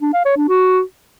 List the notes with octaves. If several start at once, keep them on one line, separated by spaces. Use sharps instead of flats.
D4
F5
C#5
D4
F#4